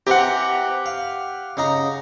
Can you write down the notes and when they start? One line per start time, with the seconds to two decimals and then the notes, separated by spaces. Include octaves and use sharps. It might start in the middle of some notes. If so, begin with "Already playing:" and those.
0.07 E3 C4 G4 F#5 A#5
0.86 F5
1.57 C#3 D#4 A#5